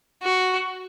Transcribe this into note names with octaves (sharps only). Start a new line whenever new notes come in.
F#4